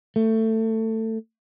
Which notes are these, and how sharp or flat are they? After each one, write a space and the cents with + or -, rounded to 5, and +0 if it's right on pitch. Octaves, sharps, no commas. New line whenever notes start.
A3 +20